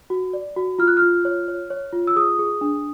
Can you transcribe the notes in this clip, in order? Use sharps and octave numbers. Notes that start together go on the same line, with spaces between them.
F#4
D5
F#4
F4 F6
F#6
F6
F4
C#5
C#5
C#5
F4
E6
G#4 D#6
G#4
D4